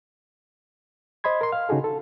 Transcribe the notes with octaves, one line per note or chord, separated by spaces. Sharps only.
C5 D#5 B5 C6 G#6
A#4 C6
F5 F6
C#3 D#4 F#4 G#4 A4
A4